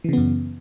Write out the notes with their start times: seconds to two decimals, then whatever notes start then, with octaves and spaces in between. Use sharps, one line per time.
0.04 E3
0.09 C#3
0.13 B3
0.18 F#2